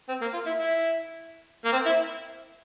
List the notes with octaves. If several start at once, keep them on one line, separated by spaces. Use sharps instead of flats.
C4
A#3
F4
E4
E4
A#3
C4
E4